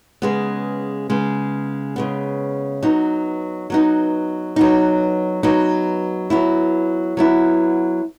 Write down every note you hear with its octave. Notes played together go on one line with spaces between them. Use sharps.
C#3 G#3 B3
C#3 G#3 B3
C#3 G#3 B3
F#3 B3 D#4
F#3 B3 D#4
F#3 B3 D#4
F#3 B3 D#4
F#3 B3 E4
F#3 B3 E4